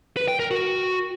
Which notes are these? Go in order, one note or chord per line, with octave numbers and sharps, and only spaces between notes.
B4
G5
A#4
F#4